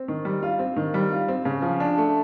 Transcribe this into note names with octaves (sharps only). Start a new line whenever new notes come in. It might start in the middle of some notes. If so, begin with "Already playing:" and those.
Already playing: C4
D#3
G3
F4
C4
D#3
G3
F4
C4
C#3
F3
D4
A3